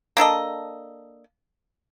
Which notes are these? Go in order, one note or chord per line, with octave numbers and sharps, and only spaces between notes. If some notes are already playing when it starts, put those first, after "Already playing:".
A#3 D4 A4 D#5